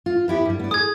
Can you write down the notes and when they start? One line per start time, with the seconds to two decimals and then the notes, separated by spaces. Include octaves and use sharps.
0.06 F4
0.28 B3 E4 G4
0.45 G2 G3
0.59 B3 D5
0.71 G#4 D#6 G#6